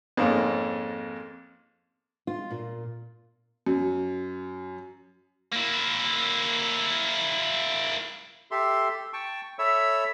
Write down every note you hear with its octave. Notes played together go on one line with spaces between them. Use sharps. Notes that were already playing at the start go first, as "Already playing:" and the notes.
F2 G#2 A#3 C#4
F4
A#2
F#2
A#3 E4
G4 A4 E5 C6
G5 A5 C#6
A4 C#5 E5 B5 E6